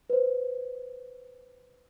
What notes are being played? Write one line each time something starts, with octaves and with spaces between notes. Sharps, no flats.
B4 C5